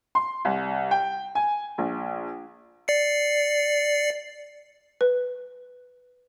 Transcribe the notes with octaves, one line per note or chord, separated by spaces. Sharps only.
C6
C2
G5
G#5
A#1
D5 C7 C#7
B4